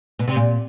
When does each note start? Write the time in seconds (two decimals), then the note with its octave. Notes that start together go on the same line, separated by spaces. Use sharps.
0.19 B2
0.28 C3
0.36 A#2